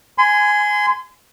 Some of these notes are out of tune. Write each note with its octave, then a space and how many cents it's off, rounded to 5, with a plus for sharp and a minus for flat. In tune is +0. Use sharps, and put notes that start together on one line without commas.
G#5 +5 C6 -35